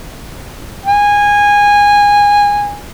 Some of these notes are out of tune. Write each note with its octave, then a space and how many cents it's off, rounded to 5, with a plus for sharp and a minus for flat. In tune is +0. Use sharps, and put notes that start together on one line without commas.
G#5 -20